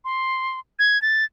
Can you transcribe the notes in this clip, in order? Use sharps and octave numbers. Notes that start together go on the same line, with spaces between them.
C6
G#6
A6